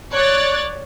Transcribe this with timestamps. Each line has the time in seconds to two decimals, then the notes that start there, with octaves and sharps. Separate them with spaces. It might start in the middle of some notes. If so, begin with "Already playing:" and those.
0.12 C#5 D5 F#6 G#6 A6